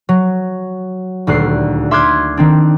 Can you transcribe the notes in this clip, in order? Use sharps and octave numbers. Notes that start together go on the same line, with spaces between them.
F#3
D#1 D2 F#6 C7
E5 C6 D6 F6 F#6 G#6
D#3 C4 D4